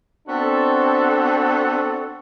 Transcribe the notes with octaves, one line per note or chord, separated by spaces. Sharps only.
B3 C4 D4 F#4 A4